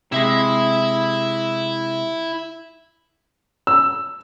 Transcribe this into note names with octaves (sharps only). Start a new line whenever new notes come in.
C3 G#3 E4 E5
E6